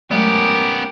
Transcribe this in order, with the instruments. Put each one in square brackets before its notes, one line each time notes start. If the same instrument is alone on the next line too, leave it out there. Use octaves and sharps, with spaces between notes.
[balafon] F#3 G#3 A3 [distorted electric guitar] B3 C#4 [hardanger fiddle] G4 A#4